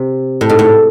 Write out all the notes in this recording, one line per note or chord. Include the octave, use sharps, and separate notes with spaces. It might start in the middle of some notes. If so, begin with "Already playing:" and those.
Already playing: C3
A2
G#2
A2